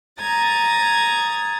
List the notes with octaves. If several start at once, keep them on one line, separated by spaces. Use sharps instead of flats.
A#5 D#6 G#6 A6